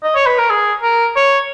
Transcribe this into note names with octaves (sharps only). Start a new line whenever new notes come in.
D#5
C#5
B4
A#4
G#4
A#4
C#5